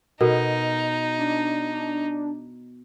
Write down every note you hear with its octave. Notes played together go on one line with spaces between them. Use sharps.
B2 D#4 A4 A#4
D4